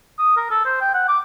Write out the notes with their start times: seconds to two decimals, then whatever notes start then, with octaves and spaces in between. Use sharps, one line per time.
0.19 D#6
0.37 A#4
0.51 A4
0.66 C5
0.81 G5
0.94 F#5
1.08 D6